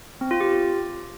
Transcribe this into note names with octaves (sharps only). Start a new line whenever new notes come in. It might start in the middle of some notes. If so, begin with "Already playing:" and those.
C4
F4
G4